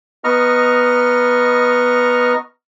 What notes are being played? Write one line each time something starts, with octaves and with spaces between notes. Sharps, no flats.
B3 D#5 A#5 C#6 F6